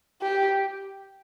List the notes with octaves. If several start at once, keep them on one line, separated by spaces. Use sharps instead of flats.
G4